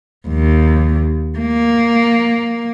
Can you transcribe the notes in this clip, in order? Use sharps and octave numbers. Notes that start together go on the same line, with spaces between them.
D#2
A#3